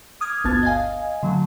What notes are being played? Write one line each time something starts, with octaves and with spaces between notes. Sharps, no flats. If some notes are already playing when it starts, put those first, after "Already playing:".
D6 D#6 F6 G#6
G1 D2 B3 A5 G#6 A6
D#5 F5 G#5
D3 F#3 A3